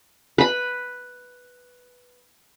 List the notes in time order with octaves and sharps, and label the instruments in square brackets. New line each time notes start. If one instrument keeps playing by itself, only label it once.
[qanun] B4 B5